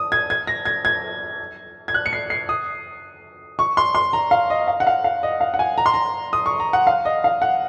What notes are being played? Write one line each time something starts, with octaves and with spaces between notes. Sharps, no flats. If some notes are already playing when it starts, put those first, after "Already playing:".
Already playing: D#6
G#6
G#6
A#6
G#6
G#6
G#6
F#6
C#7
C7
C7
D#6
C#6
C6
C6
A#5
F5
D#5
F5
F#5
F5
F5
D#5
F5
F#5
G#5
A#5
C6
A#5
D#6
C#6
A#5
F#5
F5
D#5
F5
F#5